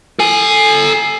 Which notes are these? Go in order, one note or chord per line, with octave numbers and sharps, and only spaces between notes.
A4 G#5